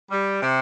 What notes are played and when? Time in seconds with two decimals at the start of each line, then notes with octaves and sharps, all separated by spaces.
0.11 G3
0.42 C3